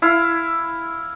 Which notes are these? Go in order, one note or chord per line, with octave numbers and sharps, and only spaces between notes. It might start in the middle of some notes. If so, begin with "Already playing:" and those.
E4 F5